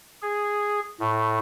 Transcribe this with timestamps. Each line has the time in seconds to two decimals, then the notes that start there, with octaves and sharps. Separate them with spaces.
0.22 G#4
1.00 A2